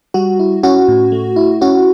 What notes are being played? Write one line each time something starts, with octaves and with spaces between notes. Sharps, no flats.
G3 F#4
E4
C#4 F#4
A2
A3
E4
C#4 F#4